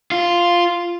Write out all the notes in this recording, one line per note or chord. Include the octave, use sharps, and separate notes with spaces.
F4